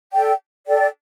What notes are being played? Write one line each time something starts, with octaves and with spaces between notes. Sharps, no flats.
A4 D5 G5
A4 D5 G5